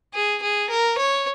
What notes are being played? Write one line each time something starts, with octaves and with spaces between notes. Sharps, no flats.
G#4
G#4
A#4
C#5